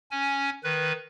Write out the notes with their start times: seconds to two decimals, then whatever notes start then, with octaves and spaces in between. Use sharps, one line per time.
0.11 C#4 G#5
0.64 D#3 B4